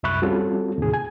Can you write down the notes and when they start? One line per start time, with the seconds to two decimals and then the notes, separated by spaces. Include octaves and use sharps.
0.03 C2 F#2 E5 B5 C#6 F#6
0.22 G3 C4 C#4 F4 F#4 A4
0.78 D#2 A2 C3 G#4
0.94 G#5